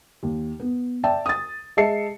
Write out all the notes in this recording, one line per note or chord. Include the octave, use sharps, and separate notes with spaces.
D#2
B3
D5 E5 G5 A5
D#6 A6
G#3 D#5 E5 A5 C7 C#7